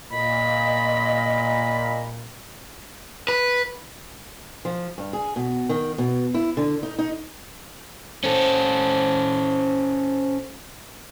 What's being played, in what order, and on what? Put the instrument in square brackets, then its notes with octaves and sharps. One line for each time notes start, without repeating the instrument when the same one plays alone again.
[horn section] A#2 [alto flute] D#5 [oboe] B5
[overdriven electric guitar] B4
[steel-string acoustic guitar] F3
G2
G#4
B2
D#3
B2
E4
D3
D#4
D#4
[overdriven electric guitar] C#4 A4 [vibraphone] C5